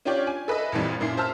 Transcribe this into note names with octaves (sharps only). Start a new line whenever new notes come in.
C#4 D4 F4 G4 C#5 D5
G#5
A4 B4 D#5 E5
A#1 F2 A#2 E3 G3
F#2 A#2 E4 C7
C5 E5 A5 E6 F6